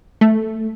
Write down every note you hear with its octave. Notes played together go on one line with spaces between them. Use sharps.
A3